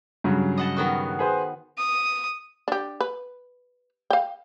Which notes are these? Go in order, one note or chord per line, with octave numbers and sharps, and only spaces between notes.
G2 C#3 F#3
D#5 F#5 A5
D#3 B3 F#4
G#4 B4 C5
D#6
D4 G4
B4
F5 G5